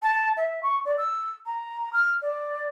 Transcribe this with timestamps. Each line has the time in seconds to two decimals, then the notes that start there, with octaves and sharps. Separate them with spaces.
0.02 A5
0.36 E5
0.62 C#6
0.84 D5
0.97 E6
1.45 A#5
1.93 F6
2.21 D5